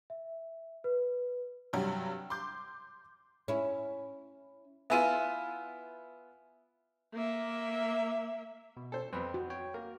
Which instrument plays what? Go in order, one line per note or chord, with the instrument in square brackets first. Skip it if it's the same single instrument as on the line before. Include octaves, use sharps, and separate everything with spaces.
[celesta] E5
B4
[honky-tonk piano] G2 C3 F#3 G3
C6 D6 G6
[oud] C#4 E4
[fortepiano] B3 E4 F4 [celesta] E5 G#5 D#7
[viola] A#3 E5
[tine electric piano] B2
[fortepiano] A4 C5
[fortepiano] F2 B3 [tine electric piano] C4 B4 C5
[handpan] F#4
[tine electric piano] C#5 G5
[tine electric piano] A#3 [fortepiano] A#4